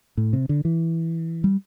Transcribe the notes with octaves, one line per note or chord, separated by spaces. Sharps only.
A2
C3
D3
E3
G3